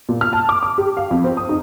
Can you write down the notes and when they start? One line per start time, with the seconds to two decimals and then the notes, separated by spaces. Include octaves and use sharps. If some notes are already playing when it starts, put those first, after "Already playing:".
0.09 A#2
0.21 F6
0.33 A5
0.49 D6
0.63 D6
0.78 G4
0.97 F5
1.11 F2
1.24 C4
1.37 D#6
1.49 D#4